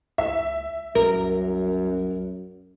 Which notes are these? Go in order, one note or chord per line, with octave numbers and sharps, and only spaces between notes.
C#2 E5
C2 F#2 A#4